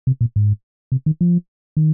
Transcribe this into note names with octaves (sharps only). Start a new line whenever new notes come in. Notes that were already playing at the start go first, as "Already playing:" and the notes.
C3
A#2
G#2
C3
D#3
F3
D#3